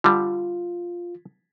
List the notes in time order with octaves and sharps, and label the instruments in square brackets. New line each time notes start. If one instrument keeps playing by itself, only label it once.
[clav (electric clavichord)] D3 G3 [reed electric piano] F4